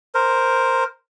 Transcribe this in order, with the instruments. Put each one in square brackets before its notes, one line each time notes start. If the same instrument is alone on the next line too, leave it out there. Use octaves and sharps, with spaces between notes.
[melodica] A#4 C5